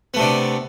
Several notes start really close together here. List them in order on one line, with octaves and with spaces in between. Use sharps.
B3 A3 C3 D4